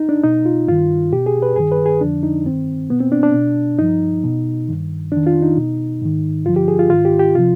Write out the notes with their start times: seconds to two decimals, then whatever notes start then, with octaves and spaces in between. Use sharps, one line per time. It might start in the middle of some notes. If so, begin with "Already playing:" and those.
Already playing: D#4
0.09 D4
0.23 B2 D#4
0.45 F4
0.68 G2 D#3 F4
1.12 B2 G4
1.26 G#4
1.42 B4
1.56 G2 D#3 G#4
1.72 B4
1.86 G#4
2.01 F2 D3 F3 D4
2.23 D#4
2.45 G2 D#3 C4
2.90 B2 B3
3.01 C4
3.12 D4
3.23 D4
3.34 B2
3.78 G2 F3 D#4
4.24 B2
4.68 G2 D#3
5.12 F2 D#3 D4
5.27 F4
5.42 D#4
5.57 B2
6.02 G#2 D#3
6.45 G2 D3 F3 F4
6.56 G4
6.68 G#4
6.79 F4
6.90 G#2 D#3 F4
7.05 G4
7.19 G4
7.35 C3 F3 F4